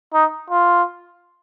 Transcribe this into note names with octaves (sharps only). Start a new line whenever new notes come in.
D#4
F4